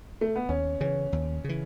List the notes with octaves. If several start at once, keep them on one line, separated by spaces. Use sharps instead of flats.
A3
B3
D#2 C#4
C#3 E3 C#4
D#2
C#3 E3